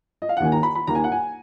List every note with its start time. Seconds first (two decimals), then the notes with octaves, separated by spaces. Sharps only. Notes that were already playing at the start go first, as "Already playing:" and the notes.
0.22 D#5
0.29 F5
0.37 F#5
0.40 D#2 D#3 A#3 G#5
0.52 A#5
0.63 B5
0.75 B5
0.87 D#2 D#3 A#3 A#5
0.95 G#5
1.04 F#5
1.12 G#5